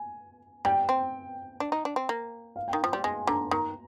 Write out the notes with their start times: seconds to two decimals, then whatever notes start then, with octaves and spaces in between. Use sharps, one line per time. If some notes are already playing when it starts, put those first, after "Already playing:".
Already playing: G#5
0.65 G3 G5
0.89 C4
1.60 D4
1.72 D#4
1.85 D4
1.96 C4
2.09 A#3
2.56 F5
2.68 G5
2.73 D#3
2.84 F3
2.92 G3 C6
3.04 G#3 G#5
3.27 D3 A#5
3.51 D#3 A#5